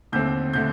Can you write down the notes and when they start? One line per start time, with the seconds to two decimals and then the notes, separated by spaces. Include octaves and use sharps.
0.12 D#2 D3 A3 C4 G6
0.53 D3 A3 G6